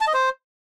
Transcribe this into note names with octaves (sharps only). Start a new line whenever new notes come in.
A5
D#5
C5